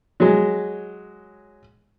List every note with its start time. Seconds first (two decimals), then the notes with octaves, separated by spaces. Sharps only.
0.20 F#3 G#3